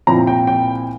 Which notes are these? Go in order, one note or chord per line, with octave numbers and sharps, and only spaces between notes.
A#2 F3 C4 E4 A#5
G5
G5